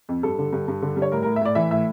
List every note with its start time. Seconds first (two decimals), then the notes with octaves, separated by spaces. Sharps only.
0.09 F2
0.23 G2 A4
0.39 D3
0.53 G2
0.68 G2
0.82 D3
0.97 G3
1.02 C#5
1.12 A2 A#4
1.23 A2 A#4
1.36 E5
1.42 A2 D5
1.55 E3 E5
1.71 A2 E5